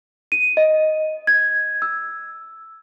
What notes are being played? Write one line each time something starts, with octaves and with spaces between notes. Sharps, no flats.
D#7
D#5
G#6
E6